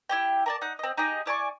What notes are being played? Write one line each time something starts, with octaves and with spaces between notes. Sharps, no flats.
E4 G4 G5
A#4 D5 A5
D#4 F#5
C4 D#5
D#4 G4 G#4 D#5
E4 D5 G#5 C#6